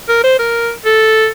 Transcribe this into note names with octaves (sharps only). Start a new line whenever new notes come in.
A#4
C5
A#4
A4